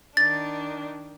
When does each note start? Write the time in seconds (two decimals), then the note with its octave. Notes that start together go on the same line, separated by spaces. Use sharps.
0.17 D#3 D4 A6